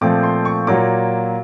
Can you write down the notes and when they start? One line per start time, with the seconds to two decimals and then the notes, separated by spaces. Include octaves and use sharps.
0.01 A#2 F3 A3 C4 D6
0.23 C6
0.45 C#6
0.67 A#2 F#3 A#3 D6